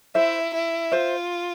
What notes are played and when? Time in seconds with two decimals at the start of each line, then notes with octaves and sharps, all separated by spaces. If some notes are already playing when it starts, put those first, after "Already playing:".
0.15 E4 C5 E5
0.54 E4
0.92 F4 C5 E5